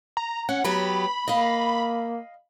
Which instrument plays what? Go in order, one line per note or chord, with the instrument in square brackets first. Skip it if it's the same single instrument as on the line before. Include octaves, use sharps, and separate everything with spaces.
[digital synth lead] A#5
[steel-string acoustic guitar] C#4 [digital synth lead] F#5
[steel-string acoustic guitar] F#3 B3 G4 [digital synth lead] B5
[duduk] A#3 [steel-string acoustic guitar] D#5 F5